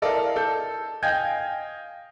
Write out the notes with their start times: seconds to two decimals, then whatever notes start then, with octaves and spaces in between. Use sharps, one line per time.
0.02 E4 A4 A#4 D5 D#5 F5
0.36 A4 G6
1.03 D#5 F5 G5 G#5 G6 G#6